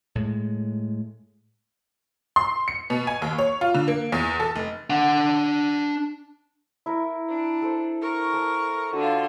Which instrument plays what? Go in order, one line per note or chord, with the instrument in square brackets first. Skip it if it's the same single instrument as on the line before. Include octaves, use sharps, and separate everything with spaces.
[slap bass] A2 G#3
[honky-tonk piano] C6
C#7
B2
G#5
D#2
C#5
F4
D3
A#3
E2
A4
F1
[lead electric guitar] D4 F#5
[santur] E4 A#4
[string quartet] D4
[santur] A4 C5
[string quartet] A#4 C#6
[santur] A4 C5
[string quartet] D3 F4 [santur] F#4